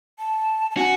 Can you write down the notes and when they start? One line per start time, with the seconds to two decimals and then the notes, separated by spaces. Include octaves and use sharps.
0.19 A5
0.71 A5
0.77 F#4 G#5